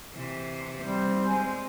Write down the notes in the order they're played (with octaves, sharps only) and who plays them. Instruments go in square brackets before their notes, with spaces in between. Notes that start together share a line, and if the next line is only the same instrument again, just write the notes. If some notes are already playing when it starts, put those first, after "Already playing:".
[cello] C3 E3
[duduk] G3 [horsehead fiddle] C4 C5
[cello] G#3 [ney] G#5